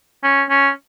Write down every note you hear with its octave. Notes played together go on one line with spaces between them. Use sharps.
C#4
C#4